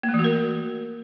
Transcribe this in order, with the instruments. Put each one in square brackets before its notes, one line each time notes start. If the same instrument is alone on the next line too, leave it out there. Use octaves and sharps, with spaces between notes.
[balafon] A#3
A3
E3
F#4
A#4